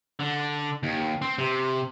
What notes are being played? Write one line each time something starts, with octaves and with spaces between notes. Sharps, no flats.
D3
D#2
C4
C3